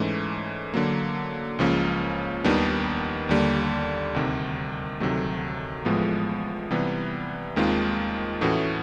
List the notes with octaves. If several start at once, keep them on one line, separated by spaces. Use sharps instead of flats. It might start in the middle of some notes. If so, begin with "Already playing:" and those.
Already playing: G#2 E3 A3 C#4
D3 F#3 A#3
C#2 C#3 F3 A#3 C#4
D#2 D#3 G3 B3 D4
D#2 D3 G3 A#3
D2 C3 D#3
D2 C3 D#3 F#3 A3
A1 A2 F3 G#3 B3
C3 E3 G3 B3
D#2 D#3 G#3 C4 F4
A2 E3 A3 C#4 F#4